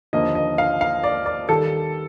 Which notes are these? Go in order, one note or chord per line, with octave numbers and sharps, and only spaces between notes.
D#2 D3 F3 A#3 D#5
D#5
F5
F5
D5
D5
D#3 G3 A4